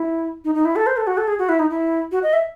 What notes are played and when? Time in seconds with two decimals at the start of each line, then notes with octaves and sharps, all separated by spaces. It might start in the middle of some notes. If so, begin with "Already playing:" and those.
Already playing: E4
0.44 D#4
0.55 D#4
0.65 E4
0.76 A4
0.87 C5
0.97 A4
1.07 F#4
1.18 A4
1.28 G#4
1.39 F#4
1.49 E4
1.59 D#4
1.70 E4
2.12 F#4
2.23 D#5
2.33 E5